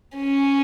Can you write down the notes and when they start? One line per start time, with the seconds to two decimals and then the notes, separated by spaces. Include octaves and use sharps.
0.17 C#4